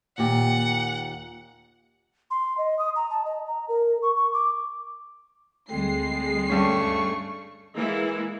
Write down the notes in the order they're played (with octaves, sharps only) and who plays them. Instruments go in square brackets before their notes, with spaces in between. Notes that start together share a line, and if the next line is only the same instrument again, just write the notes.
[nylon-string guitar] D#2 A#2 G4 [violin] F#5
[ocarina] C6
D#5
D#6
A#5
A5
D#5
A#5
A#4
C#6
C#6
D6
[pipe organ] D2 D3 C4 [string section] G3 G#3 C7
[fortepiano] G2 C#4 [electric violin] A3 C#6
[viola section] E3 G#3 A#3 E4